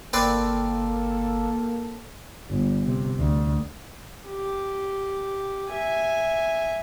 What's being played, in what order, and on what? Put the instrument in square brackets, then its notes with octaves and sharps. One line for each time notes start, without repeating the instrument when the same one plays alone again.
[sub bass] G1 [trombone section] A#3 A4 [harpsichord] C4 B4 D5
[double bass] G1
C3
D2
[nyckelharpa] G4
E5 G#5